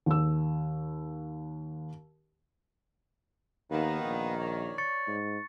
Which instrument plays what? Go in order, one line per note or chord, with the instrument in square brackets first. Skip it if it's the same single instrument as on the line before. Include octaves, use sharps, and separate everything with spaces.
[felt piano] D#2 E6
[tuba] D#2 [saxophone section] D#3 [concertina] A#3 B3 B4
[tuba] A#1
[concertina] C#5 D5
[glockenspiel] C#6 A6 C#7
[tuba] G#2